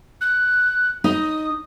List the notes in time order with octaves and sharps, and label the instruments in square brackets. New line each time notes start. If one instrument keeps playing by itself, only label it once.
[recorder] F#6
[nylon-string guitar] D#4 [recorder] D#6